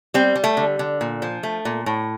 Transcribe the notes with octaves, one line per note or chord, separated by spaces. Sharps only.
G3 C4
G3
A3
D3
D3
A#2
F3
A3
A#2
A2